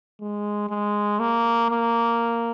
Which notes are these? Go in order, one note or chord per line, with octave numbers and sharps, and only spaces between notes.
G#3
G#3
A#3
A#3